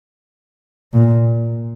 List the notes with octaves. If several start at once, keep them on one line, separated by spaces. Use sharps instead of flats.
A#2